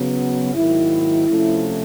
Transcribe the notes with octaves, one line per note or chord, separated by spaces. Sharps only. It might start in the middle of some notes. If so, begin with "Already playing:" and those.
Already playing: C#3 F#3 B3
G#2 D#3 F#3 A#3 E4
C3 F3 A3 C#4